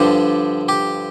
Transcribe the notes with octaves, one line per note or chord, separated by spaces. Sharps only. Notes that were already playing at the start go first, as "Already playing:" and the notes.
Already playing: G2 D3 F3 G4
G4